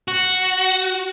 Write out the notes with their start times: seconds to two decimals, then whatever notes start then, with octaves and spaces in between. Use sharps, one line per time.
0.08 F#4